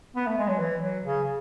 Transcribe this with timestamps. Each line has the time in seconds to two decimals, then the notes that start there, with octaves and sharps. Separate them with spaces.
0.16 B3
0.27 A3
0.38 G#3
0.48 F#3
0.59 E3
0.83 F#3
1.05 C#3